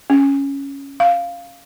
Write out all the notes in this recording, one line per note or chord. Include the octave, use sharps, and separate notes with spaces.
C#4
F5